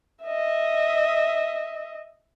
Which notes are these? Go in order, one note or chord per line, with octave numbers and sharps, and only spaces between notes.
D#5 E5